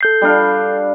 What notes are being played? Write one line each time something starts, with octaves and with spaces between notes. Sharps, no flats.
A4 G6 C7
G3 D4 F5